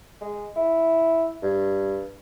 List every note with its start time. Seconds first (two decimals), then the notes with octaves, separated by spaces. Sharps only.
0.21 G#3
0.56 E4
1.43 G2